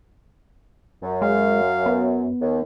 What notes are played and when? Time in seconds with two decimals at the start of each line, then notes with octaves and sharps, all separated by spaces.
1.03 F#2
1.22 G#3 F5
1.86 B3
2.41 D#2